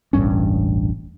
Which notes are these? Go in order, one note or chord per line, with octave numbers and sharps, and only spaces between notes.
E1 A1 G2 C#4